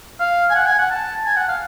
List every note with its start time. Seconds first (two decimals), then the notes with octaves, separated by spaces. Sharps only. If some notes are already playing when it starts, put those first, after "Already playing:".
0.20 F5
0.50 G#5
0.55 F#5
0.66 G#5
0.78 F#5
0.91 A5
1.25 G#5
1.36 F#5
1.48 F5